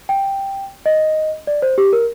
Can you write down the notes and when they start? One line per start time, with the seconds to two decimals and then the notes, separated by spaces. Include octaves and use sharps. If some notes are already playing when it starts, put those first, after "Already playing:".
0.09 G5
0.86 D#5
1.47 D5
1.62 C5
1.78 G4
1.93 A#4